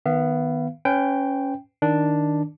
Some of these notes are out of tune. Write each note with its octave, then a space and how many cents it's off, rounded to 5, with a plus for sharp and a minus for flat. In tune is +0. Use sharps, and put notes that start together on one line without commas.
D#3 +0 B3 +0 F5 -45
C#4 +0 B4 +35 G5 +0
D#3 +0 D4 +0